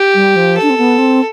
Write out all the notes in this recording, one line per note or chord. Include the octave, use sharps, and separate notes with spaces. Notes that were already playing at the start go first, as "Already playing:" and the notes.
Already playing: G4
G3
F3
A4
D4
C4
B3
C4